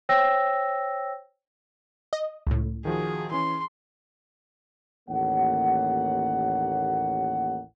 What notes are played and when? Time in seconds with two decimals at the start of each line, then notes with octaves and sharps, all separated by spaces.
0.09 C5 C#5 G5 E6 A#6
2.13 D#5
2.47 C#2 A2
2.85 D#3 F3 F#4 G#4
3.31 E3 C#4 C6
5.09 A1 D#2 A#3 C#5 F#5